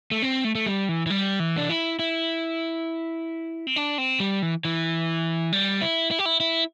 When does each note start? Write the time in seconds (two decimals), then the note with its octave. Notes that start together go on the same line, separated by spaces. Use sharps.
0.11 A3
0.22 C4
0.44 A3
0.55 A3
0.66 G3
0.89 E3
1.06 E3
1.10 G3
1.40 E3
1.58 D4
1.70 E4
1.99 E4
3.67 C4
3.76 D4
3.98 C4
4.20 G3
4.42 E3
4.65 E3
5.52 G3
5.82 E4
6.11 E4
6.19 G4
6.26 E4
6.40 E4